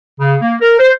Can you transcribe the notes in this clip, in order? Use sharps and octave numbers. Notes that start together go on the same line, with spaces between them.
C#3
A#3
A#4
C5